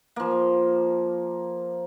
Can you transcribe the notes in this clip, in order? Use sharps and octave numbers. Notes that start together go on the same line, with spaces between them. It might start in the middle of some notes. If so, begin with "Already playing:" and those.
F3 A#3